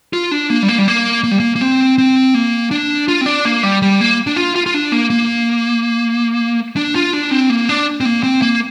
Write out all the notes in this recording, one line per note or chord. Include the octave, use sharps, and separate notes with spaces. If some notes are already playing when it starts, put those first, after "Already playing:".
F4
D4
A#3
G3
A#3
G3
A#3
A#3
G3
A#3
A#3
C4
C4
A#3
D4
F4
C4
D4
A#3
G3
G3
A#3
D4
F4
F4
F4
D4
A#3
A#3
D4
F4
D4
C4
A#3
D4
C4
A#3
C4
A#3